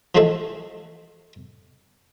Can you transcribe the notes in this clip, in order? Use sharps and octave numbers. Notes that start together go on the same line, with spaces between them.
E3 F3 G#3 A3 G#4 A4